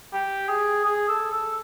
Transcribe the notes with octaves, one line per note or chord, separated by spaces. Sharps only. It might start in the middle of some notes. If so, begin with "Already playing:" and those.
G4
G#4
G#4
A4
A4